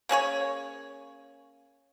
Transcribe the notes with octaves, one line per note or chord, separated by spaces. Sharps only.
A#3 C#4 G#4 C#5